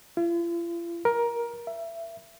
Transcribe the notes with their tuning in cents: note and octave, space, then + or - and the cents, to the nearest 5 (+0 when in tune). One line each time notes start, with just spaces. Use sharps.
F4 -45
A#4 +15
E5 +25